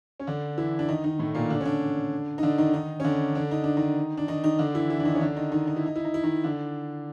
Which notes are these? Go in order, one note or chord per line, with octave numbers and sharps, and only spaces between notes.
C#4
D3 D4
E3 E4
D4
D#3 D#4
D#3 D#4
A2 A3
A#2 A#3
D3 D4
C#4
D3 D4
D#4
D3 D4
D#3 D#4
D#3 D#4
C#4
D3 D4
D3 D4
D#4
D4
D#3 D#4
D4
D#3 D#4
D#3 D#4
D3 D4
E3 E4
E3 E4
D4
D#3 D#4
C#4
D3 D4
D#3 D#4
D#3 D#4
D#4
E4
D#4
E4
D#4
E4
D#3 D#4
D3 D4